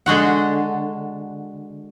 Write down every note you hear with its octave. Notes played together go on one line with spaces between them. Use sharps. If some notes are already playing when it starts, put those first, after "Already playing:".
D3 G#3 F#4 F#5